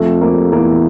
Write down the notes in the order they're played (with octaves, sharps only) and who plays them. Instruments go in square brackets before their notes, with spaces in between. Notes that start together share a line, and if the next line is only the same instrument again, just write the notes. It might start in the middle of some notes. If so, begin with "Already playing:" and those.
Already playing: [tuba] F2 [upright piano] A3
[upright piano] A#3
[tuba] E2 [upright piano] A#3